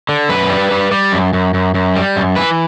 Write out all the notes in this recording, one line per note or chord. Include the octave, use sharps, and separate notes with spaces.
D3
F#2 B4
G3
G3
G3
F#2
F#2
F#2
F#2
G3
F#2
E3 B4